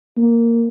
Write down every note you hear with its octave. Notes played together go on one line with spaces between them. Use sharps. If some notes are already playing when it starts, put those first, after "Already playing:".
A#3